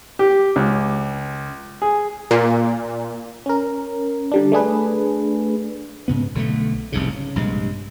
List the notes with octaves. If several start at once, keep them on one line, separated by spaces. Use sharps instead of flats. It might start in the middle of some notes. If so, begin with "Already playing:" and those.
G4
C#2
G#4
A#2
C#4 A#4
D3 G3 D4
A3 D4 G#4 B4
G#2 C#3 B3
B1 D3 F3 A3
F1 C2 G#2 C#3
C#3
A#1 G2 C3 G#3